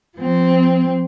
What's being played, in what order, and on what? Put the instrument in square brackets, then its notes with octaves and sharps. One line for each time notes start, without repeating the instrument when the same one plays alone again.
[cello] F3 C4